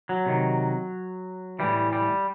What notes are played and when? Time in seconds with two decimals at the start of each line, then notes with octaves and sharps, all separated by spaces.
0.09 F#3
0.26 C3 D#3
1.59 A2 E3 G3
1.93 G3